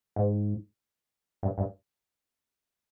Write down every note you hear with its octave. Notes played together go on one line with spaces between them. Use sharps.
G#2
G2
G2